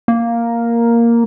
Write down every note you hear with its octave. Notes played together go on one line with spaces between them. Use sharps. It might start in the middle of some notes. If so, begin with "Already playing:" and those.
A#3